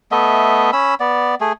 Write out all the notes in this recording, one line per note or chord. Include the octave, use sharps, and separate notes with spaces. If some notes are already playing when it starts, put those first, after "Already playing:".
A3 B3 D#5 E5
C#4 B5 E6
B3 D5
A3 G#4